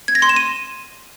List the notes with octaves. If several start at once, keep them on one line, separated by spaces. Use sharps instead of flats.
G#6
A#6
C6
E7
D#7